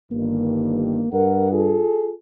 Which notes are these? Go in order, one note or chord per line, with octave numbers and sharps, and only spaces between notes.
G1 G2 D#3 A#3
G2 A#4 F#5
F4 G#4 A4